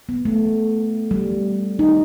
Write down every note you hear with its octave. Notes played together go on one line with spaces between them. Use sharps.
B3
A3
G3
D#4